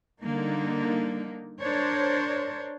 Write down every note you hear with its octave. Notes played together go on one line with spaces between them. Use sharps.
D3 G3 A#3 D#4
D4 A#4 C5 C#5